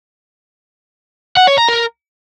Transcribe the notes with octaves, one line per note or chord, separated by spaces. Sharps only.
F#5
C#5
A#5
A#4